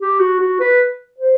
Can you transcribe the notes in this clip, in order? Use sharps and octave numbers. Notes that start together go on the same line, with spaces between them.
G4
F#4
F#4
B4
C5